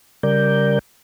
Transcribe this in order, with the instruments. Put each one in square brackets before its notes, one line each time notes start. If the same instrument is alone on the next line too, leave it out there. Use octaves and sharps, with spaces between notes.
[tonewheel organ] C#3 G3 A#4 D5 G6